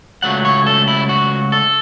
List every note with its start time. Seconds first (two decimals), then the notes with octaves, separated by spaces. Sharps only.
0.22 C#2 C#3 F#3 A3 F#5
0.45 C#5
0.66 A4
0.88 E4
1.09 F#4
1.52 A4